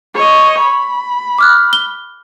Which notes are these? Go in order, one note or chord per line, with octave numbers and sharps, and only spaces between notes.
C#5 D#5
B5
D6 F6 F#6
G7